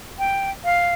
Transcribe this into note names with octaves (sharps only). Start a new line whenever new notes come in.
G5
F5